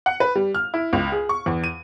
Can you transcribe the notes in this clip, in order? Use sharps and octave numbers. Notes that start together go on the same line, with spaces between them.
F#5
B4
G3
F6
E4
C#2
G#4
C#6
E2
D#7